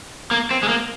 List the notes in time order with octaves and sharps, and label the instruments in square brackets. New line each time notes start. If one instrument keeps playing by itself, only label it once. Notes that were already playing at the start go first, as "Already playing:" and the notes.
[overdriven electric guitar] A#3
C4
G#3
A#3